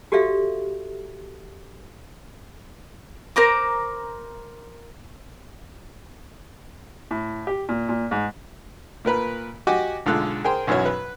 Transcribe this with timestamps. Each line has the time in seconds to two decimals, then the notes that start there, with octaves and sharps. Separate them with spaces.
0.12 F#4 G4 A4 D5 E5 F5
3.36 A#4 C5 A#5 D6
7.11 A2
7.47 G4
7.69 A#2
7.89 A#2
8.11 G#2
9.05 A#2 A#4 B4 B5
9.67 F#4 G4 D#5 F#5 G#5 D6
10.06 B1 D3 G#3 F4 A4 F#6
10.44 G#4 A#4 C5 G5 C6
10.67 B1 F#2 E3 F#4 C#5
10.86 B4